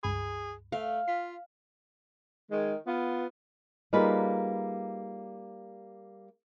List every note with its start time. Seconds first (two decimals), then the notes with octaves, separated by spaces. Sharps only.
0.03 C#2 G2 G#4 B5
0.72 A3 F5
1.08 F4 B6
2.51 D#3 G#3
2.87 B3 F4
3.93 G3 A#3 D#4 F4 G#4 B4